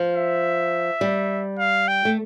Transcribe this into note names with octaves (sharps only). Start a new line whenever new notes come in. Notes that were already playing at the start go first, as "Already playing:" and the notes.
Already playing: F3
E5
G3
F5
G5
A3